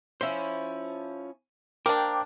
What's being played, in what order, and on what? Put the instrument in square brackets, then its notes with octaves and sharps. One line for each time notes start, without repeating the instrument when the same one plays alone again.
[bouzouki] F3 C#4 E4 [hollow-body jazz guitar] C5
[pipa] A#3 D4 [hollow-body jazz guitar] A#4 [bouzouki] C5 [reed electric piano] G5 D6